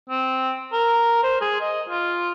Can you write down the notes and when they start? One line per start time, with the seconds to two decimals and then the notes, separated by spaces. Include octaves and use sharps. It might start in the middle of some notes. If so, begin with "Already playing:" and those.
0.09 C4
0.72 A#4
1.23 C5
1.41 G#4
1.61 D#5
1.89 F4